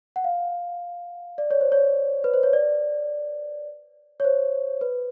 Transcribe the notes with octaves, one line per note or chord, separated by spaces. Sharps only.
F#5
F5
D5
C#5
C5
C#5
B4
C5
C#5
D5
C#5
C5
B4